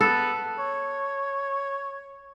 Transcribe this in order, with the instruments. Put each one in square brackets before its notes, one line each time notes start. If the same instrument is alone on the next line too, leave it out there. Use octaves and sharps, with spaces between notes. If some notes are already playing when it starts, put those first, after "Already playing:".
[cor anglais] B3 [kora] A4
[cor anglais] C#5